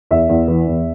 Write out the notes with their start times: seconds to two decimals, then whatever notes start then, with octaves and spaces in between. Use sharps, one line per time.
0.11 E2 E5
0.29 E2
0.48 E3
0.67 E2